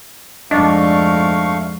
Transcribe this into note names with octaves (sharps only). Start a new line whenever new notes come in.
F2 G#2 A3 D4 D#5 F5 C#6